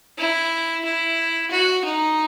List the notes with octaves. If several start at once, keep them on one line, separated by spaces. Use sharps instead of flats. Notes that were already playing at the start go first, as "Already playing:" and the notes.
E4
E4
F#4
D#4